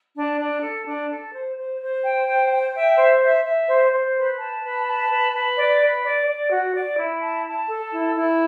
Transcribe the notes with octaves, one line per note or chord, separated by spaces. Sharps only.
D4
D4
A4
D4
A4
C5
C5
C5
G5
C5
G5
E5
C5
E5
E5
C5
C5
B4
A5
B4
A5
B4
B4
D5
B4
D5
D5
F#4
D5
E4
A5
A5
A4
E4
E4